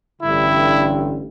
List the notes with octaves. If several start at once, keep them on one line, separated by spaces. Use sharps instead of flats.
A1 G2 D3 E4